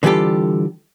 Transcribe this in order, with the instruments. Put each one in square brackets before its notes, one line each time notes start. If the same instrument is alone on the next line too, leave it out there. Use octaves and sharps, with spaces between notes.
[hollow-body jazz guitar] D3 E3 G3 F4 G4 A4